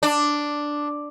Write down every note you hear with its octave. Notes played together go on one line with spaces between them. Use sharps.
D4